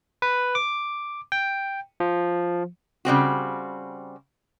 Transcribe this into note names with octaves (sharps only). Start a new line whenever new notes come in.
B4
D6
G5
F3
C#3 G3 C4 F#4